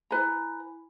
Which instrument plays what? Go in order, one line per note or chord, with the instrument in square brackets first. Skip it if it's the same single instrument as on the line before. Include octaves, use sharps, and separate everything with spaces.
[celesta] E4 G#5 B5 [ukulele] B4 A#5